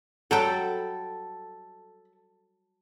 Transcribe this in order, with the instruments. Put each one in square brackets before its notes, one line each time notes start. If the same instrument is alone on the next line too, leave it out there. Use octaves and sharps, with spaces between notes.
[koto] F#3 G3 G5 [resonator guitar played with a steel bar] A4 [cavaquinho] F#5 B5